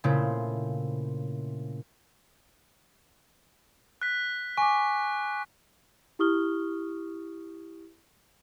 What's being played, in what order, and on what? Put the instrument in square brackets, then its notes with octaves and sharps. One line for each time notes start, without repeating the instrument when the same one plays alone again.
[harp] A#2 C#3 A3 C4 E4
[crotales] F#6 B6
[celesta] G#5 D6 [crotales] C#6
[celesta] E4 G4 C#6 D#6 F6 G7